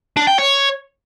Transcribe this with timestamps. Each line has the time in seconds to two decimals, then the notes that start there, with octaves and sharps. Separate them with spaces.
0.17 D4
0.27 G5
0.38 C#5